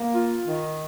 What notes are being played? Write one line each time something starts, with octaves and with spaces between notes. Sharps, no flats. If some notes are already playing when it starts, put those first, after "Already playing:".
Already playing: A#3
F4
D#3